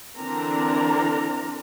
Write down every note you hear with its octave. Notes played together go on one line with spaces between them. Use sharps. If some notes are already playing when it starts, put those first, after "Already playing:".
D3 E3 C4 D4 A#4 A#5